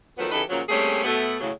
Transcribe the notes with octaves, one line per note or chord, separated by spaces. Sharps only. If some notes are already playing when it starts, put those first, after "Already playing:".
D#3 F3 F#3 A3 B3
C#3 E3 D#4 G4 A4 B4
A#2 C#3 F3 F#3
G3 A3 A#3 C4 C#4 G#4
B2 A3 B3
A2 C#3 F#3